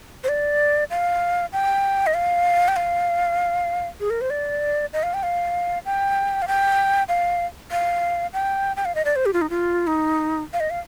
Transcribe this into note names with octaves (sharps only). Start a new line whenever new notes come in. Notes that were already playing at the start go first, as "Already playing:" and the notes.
C5
D5
F5
G5
D#5
F5
G5
F5
G#4
A#4
C5
D5
D#5
F5
G5
F5
G5
F5
G5
F5
F5
G5
G5
F5
D#5
D5
C5
G4
F4
D#4
F4
D#4
F5
D#5
F5